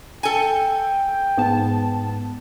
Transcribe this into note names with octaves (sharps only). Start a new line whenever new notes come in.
A4 G5 G#5
G#2 B3 A5